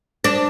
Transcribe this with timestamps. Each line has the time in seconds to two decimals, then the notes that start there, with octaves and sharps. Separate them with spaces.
0.24 D4